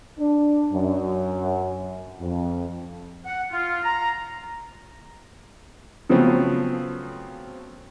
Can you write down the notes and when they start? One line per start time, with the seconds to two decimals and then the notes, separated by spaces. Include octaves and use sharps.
0.18 D4
0.72 F#2
2.19 F2
3.26 F#5
3.52 F4
3.84 A#5
6.10 C#3 F3 F#3 A3 B3 C4